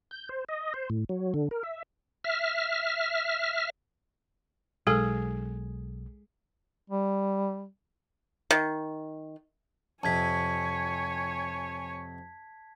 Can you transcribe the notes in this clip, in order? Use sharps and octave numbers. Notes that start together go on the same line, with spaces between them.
G6
C5
D#5
C5
A2
F#3
D3
A#4
E5
E5 F6
B1 G#3 G#4 A4
G3
D#3
F2 C3 C#5 G#5 A5 G#6 B6